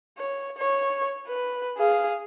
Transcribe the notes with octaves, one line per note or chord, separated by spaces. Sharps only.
C#5
C#5
B4
G#4 F5